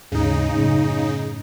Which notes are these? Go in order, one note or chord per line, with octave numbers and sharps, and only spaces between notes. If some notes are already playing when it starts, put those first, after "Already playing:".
G#1 D#2 G#2 C#3 D#4
F#2 A2